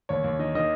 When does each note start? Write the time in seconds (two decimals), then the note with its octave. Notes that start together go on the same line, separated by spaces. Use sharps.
0.09 D#2 C#5
0.24 D#2
0.39 D#3 D#5
0.55 D#3 D#5